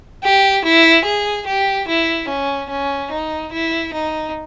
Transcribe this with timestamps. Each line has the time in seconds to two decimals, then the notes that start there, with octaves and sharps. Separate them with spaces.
0.23 G4
0.64 E4
1.05 G#4
1.47 G4
1.88 E4
2.28 C#4
2.70 C#4
3.11 D#4
3.52 E4
3.93 D#4